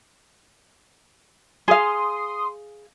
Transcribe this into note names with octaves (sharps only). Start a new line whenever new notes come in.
G#4 F5 C6 D#6